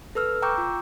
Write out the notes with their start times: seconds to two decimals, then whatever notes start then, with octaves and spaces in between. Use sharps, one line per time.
0.15 A4 B4 E6 F6
0.42 G5 A#5 C#6 D6 E6 G6
0.58 F4